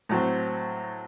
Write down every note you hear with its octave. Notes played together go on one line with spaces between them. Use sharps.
A2 F#3 C4